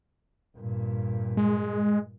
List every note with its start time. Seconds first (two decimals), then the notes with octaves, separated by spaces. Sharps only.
0.57 G2 A#2
1.37 G#3